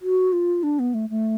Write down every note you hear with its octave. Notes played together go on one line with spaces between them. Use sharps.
F#4
F4
D4
B3
A3
A3